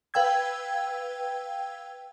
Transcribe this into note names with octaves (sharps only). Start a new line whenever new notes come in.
B4 F5 G5 E6 G#6